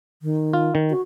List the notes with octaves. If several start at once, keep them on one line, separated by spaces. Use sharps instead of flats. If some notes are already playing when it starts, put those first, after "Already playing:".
D#3
F4
D#3
F#4